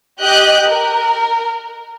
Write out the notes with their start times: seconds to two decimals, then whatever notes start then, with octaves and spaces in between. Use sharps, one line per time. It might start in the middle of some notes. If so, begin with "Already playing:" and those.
0.21 G4 D#5 F#6 G6
0.68 A#4